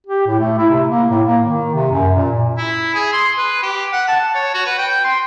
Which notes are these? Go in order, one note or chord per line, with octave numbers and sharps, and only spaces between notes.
G4
A2
A3
E4
C3
A#3
A2
A#3
D#3
C3
F#2
A#2
E4
G#4
C6
B4
G4
F#5
A5
C#5
F#4
B4
G5
C6